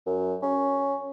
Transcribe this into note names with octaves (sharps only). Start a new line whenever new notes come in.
F#2
C#4